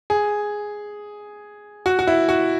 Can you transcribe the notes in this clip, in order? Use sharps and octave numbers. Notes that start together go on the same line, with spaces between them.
G#4
F#4
F#4
E4
F#4